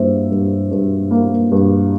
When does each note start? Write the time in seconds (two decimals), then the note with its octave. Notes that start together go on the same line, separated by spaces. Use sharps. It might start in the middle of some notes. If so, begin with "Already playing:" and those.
Already playing: G2 A#3 C5 E5
0.31 G2
0.71 G2
1.11 A#3
1.52 G2